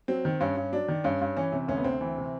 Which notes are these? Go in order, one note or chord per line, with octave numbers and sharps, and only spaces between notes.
F#3 C4
D#3
G2 C#4
G2
F#3 D4
D#3
G2 C#4
G2
E3 C#4
C3
D2 C#4
B3
D2 C4
E3
C3